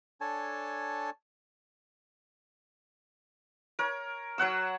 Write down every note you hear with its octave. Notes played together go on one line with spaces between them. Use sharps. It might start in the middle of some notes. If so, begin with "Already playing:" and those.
D4 A4 C#5 G#5 A5
A#4 C#5
F#3 C#5 F#5 E6